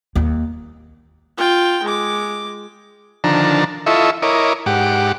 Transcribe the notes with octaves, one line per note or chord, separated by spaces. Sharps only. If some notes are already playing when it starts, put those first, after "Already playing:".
D#2
F4 G5
G#3 D6
D3 D#3 F3 D4 A5 A#5
E4 F4 A4 D#5 E5 C#6
E4 A#4 C#5 D#5 D6
G#2 G4 F#5 D6